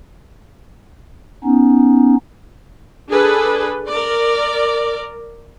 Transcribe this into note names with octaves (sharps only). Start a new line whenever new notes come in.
B3 C#4 D#4
D4 G#4 A4 B4
A#4 D5